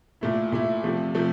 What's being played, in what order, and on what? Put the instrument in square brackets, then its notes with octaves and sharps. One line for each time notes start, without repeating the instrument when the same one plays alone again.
[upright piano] A#2 A3 E4
A#2 A3 E4
C3 F3 A3
C3 F3 A3